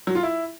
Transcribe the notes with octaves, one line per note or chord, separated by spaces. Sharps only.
F#3
F4
E4